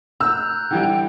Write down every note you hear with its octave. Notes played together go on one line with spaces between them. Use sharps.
A#5 E6 F#6 G6
D3 E3 G3 G5